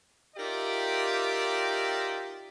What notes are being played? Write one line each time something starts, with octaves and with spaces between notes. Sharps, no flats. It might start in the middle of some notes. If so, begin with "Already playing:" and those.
D#4 F4 G4 A#4 D5 E5